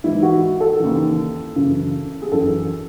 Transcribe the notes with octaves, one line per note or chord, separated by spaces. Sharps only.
G#2 E3 E4
F#4
A4
D#2 C#3 E3
F#2 C#3 E3
G#4
F#2 E3 A4